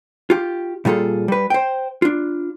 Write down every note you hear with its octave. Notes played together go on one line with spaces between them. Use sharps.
F4 G4
A#2 G3 F4 G#4 A4
G3 B4
C5 G5
D4 F4